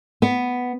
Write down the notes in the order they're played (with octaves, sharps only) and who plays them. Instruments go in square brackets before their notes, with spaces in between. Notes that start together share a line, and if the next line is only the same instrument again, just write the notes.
[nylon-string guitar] B3